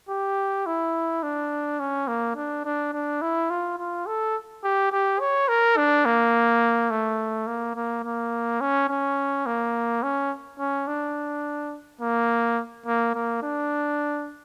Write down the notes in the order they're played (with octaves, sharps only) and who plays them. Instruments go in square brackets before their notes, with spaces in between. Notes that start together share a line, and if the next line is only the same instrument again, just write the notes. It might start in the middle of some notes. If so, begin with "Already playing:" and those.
[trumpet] G4
E4
D4
C#4
A#3
D4
D4
D4
E4
F4
F4
A4
G4
G4
C#5
A#4
D4
A#3
A3
A#3
A#3
A#3
C#4
C#4
A#3
C#4
C#4
D4
A#3
A#3
A#3
D4